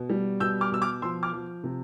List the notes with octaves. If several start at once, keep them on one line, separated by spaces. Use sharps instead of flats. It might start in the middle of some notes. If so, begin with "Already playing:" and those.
Already playing: B2
G3
B2 E6 G6
D6 F6
B2 E6
D6 F6
F3 C6 E6
D6 F6
F3
C3